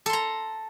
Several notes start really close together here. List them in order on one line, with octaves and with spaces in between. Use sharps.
A4 C6 A#5